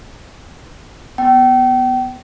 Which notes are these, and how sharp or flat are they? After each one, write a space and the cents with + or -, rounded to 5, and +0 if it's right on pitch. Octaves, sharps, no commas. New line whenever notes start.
B3 +0 G5 -35